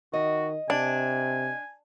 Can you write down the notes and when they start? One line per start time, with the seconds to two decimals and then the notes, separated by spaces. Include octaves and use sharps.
0.13 D#3 F#4 D#5
0.70 C3 D4 G#5